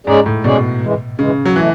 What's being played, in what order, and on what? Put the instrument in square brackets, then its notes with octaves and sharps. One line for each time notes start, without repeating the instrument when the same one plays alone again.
[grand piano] G#2 [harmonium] G#3 C#4 G#4 D5
[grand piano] A2
[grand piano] B2 [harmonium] G#3 C#4 G#4 D5
[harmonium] F#2 E3 G#3
[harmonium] F#2 E3 G#3 [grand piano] C#3
[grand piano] F#3
[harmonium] B2 A3 [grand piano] E3